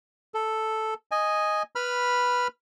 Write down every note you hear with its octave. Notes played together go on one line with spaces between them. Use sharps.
A4
D#5 G#5
B4 B5 F6